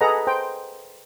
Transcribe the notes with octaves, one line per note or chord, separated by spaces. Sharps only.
G#4 A4 B4 D#5 F#5 A#5
C5 G5